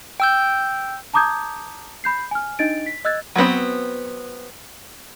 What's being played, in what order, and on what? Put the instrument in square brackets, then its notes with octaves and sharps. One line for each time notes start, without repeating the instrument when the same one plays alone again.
[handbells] G5 E6 G6
[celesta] A5 A#5 D6 D#6 G6 G#6
B5 G6 C7
G#5 F6
D4 D#4 D#5 A6 D7
B6
D#5 E6 F#6 G#6 A6
[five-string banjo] F#3 G3 B3 C4